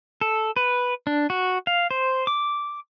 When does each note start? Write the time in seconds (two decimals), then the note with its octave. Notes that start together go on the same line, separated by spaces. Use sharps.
0.21 A4
0.56 B4
1.07 D4
1.30 F#4
1.67 F5
1.91 C5
2.27 D6